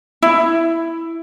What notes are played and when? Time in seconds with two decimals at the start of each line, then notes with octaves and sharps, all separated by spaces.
0.22 E4